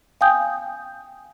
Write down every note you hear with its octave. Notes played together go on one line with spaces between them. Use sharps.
F5 G5 G#5 D#6 G6